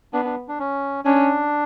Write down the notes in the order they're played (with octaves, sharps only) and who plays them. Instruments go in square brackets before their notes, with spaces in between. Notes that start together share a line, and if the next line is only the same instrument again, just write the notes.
[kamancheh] B3 [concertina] D4
[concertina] D4
D4
C#4
[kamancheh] C#4 [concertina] D4